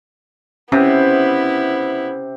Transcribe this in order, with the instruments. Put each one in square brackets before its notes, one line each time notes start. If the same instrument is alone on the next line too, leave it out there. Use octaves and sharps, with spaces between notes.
[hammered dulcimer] C3 [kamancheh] B3 E4 [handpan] C#4